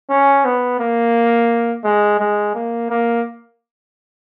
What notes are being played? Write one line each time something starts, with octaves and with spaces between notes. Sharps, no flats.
C#4
B3
A#3
G#3
G#3
A#3
A#3